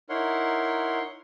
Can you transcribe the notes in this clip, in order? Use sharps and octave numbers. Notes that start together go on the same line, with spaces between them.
D#4 E4 A#4 C#5 F#5 C6